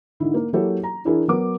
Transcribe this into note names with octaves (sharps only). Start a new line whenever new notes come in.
G#2 D3 E4
A#3 A#4
F#3 A#3 E4 G4 A4 C#5
A#5
E3 D4 E4 G#4 A#4
F#3 B3 A#4 B4 D6